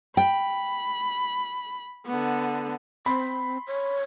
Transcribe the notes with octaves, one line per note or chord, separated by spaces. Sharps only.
G5 B5
D3 B3
C4 B5 C6
C#5